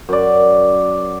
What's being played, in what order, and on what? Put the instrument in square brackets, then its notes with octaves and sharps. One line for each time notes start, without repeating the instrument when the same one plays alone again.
[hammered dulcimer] F#2 D5